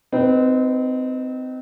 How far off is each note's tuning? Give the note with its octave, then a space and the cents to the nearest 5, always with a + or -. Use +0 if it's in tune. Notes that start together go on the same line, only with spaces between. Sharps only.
C4 -25 D#4 +0 B4 +0